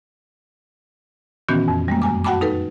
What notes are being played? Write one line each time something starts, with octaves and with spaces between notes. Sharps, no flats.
A#2 D#3 E3 B3 C#4 F#4
F2
G3 G#3 A#3
F#2 G#5 D6
F#4 F#5 G5 A5 B5 D6
D#4 A4 B4